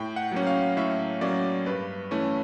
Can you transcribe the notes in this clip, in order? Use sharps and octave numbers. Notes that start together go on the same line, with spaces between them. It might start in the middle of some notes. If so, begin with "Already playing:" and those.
Already playing: A2 G5
F#5
F#3 A#3 C#4
F5
A2 E5
F#3 A#3 C#4 D5
G2 B4
E3 A3 C#4